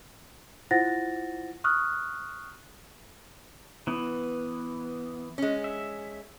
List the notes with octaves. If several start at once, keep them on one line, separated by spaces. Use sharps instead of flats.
E4 F4 C5 F#5 A6 A#6
C#6 D#6 F6 F#6
E3 B3
G#3 C#4
E5